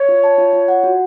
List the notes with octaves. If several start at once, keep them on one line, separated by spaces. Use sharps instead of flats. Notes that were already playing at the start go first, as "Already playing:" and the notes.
Already playing: C#5
F4
A5
F4
F4
F#5
F#4